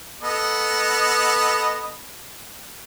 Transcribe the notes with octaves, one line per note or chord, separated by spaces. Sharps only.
B3 A4 D#5